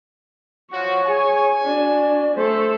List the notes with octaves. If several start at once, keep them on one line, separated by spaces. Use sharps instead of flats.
F3 F#4 C#5 F#5
G#4 G#5
D4 F#4 D5
A3 A4 C5